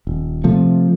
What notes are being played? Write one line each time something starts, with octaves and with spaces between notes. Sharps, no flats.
D#1
C3 F3 A3